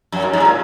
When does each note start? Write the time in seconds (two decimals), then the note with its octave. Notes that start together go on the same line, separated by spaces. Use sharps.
0.12 F#2
0.22 G#2
0.33 G#2
0.40 C3
0.45 A#2